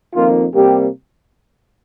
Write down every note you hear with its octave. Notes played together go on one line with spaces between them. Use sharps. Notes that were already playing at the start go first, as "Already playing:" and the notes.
F2 D#3 A#3 F4
C3 G3 A#3 G4